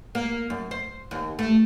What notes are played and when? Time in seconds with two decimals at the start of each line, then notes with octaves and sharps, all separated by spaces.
0.15 A#3
0.50 F#2
0.71 C5
1.11 D#2
1.39 A3